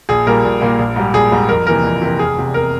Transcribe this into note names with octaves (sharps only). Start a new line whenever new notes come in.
A#1 G#4
A#2 G3 A#3 A#4
A#1
A#2 G3 A#3
A#1
G#2 G3
A#1 G#4
G#2 G3
F2 A#4
C3 E3 A#3 A#4
F2
C3 E3 A#3
F1 G#4
E2 C3
F1 A#4